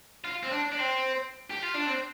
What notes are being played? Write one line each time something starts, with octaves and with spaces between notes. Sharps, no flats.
F4
C4
D4
D4
C4
G4
F4
D4
C4